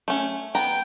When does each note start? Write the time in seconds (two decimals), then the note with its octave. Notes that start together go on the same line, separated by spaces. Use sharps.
0.08 A3 C#4
0.55 B3 G5 A#5